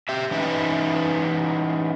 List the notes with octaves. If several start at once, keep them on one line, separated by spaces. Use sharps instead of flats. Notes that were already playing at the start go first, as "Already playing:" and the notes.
G4 E5
E3 C#4 D#4 B4 E5